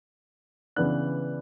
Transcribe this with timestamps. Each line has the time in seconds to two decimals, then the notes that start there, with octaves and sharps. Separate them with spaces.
0.76 C#3 E3 B3 D4 F#6